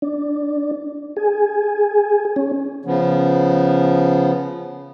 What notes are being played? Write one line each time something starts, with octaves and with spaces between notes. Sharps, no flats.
D4
G#4
C#4
C#3 F3 B3